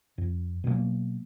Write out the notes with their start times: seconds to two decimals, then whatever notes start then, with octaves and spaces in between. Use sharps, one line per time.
0.18 F2
0.64 B2 F#3 G#3 A#3